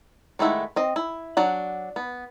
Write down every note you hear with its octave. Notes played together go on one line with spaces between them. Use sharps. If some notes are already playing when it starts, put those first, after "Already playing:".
D#3 G#3 A3 E4 F#5
C4 D#5
E4
F#3 D4 F#5
B3